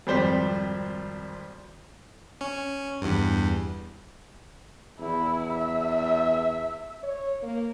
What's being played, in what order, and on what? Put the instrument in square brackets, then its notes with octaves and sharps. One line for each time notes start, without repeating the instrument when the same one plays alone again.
[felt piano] G#1 F2 G3 C5 D5 B6
[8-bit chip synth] C#4
E2 G2
[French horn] E2 [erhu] E4
[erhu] E5
[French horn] C#5
A#3